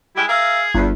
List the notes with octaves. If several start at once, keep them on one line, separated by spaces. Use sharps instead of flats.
G3 G#3 E4 G4
G#4 A#4 E5 F5
G1 E2